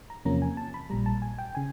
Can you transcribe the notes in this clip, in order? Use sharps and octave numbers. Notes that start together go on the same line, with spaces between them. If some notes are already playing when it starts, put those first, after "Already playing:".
A#5
E2 C3 F3 A#3 C#4 A#5
G#5
A5
B5
A#1 A#2 G3 A#5
A5
G#5
G5
C#3 G#5